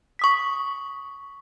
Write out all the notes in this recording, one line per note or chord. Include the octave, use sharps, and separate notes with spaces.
C#6 D#6 B6